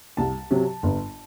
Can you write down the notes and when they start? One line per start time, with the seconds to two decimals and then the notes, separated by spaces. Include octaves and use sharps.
0.17 C2 A5
0.51 C3 F#3
0.83 G1